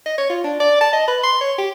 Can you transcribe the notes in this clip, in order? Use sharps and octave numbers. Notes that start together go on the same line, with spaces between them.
D#5
C#5
F4
D4
D5
A5
D#5
B4
C6
C#5
G4